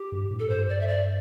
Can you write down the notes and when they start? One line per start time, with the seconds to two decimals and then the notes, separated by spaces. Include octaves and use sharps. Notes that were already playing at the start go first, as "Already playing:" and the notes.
Already playing: G4
0.12 G2
0.31 A2
0.39 A4
0.49 G2 C5
0.69 D5
0.81 E5
0.88 D5